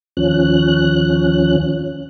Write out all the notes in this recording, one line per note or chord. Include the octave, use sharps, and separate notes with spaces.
D#2 F3 C#4 F#6